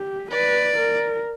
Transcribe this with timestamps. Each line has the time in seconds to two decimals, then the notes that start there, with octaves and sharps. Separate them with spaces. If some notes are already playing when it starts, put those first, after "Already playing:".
Already playing: G4
0.31 B4 D5
0.78 A#4